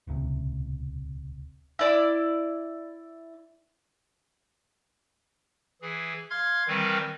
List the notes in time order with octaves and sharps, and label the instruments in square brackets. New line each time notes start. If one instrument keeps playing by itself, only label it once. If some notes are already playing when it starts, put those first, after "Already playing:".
[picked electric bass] D#1 C#2 C3
[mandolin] E4 D5 E6
[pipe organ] E3 G#4
F5 C6 F6 G#6
D#3 E3 G3 C4 A#4 B4